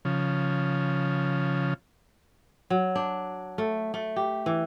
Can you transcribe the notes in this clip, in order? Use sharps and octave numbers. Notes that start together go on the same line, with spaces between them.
C#3 F3
F#3
D4
A3
A3
G4
E3